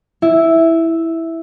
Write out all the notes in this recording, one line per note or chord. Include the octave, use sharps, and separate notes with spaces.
E4